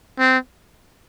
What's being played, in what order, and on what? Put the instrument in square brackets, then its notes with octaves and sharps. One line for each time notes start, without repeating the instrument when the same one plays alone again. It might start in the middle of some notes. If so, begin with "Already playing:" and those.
[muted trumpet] C4